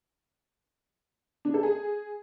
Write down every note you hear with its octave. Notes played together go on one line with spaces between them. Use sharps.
D4
A4
G#4